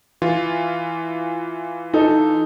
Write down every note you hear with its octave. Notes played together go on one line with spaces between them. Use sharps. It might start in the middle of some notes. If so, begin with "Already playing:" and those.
E3 F4
D#4 A4